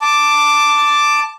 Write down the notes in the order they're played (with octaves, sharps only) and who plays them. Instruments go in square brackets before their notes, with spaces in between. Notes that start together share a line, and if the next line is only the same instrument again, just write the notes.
[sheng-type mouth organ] A5 D6